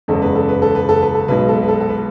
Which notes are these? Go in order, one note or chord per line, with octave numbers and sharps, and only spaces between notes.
F#1 E2 C#3 G#3 A4
B4
A4
B4
A4
B4
A4
B4
A4
B1 B2 G#3 B4
B4
A4
B4
A4
A4
B4